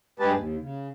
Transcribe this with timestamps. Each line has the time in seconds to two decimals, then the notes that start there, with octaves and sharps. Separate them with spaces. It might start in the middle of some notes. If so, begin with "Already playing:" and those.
0.20 G2 G#3 G4 G#4 B4 A5
0.33 D#2
0.60 C#3